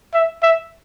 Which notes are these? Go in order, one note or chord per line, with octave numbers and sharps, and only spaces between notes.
E5
E5